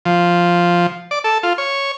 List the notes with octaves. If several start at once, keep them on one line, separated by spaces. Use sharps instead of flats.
F3
D5
A4
F4
C#5